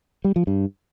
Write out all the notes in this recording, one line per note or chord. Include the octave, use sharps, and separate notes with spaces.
G3
F3
G2